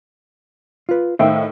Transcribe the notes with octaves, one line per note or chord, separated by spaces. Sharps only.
F4 B4
A2 D#3 C5 E5 F5 G5